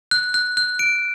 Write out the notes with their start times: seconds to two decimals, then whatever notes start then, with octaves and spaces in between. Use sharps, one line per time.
0.11 F#6
0.34 F#6
0.57 F#6
0.79 D7